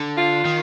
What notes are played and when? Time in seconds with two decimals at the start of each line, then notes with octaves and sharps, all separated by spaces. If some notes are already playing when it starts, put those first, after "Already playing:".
Already playing: D3
0.17 F4
0.45 D#3